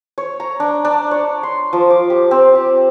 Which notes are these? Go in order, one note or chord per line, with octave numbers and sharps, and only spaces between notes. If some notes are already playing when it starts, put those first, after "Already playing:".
C#5
A#5
D4
D4
C#5
C6
F3
D6
G4
C4
G4